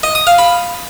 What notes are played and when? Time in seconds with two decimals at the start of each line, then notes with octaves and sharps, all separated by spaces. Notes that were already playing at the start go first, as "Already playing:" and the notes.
0.03 D#5
0.15 D#6
0.27 F5
0.38 B5